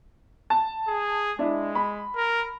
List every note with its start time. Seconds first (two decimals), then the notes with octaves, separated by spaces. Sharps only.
0.50 A5
0.88 G#4
1.39 G#3 D4 E4
1.75 B5
2.16 A#4